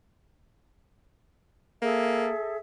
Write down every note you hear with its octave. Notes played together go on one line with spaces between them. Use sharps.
A#3 G#4 A4 E5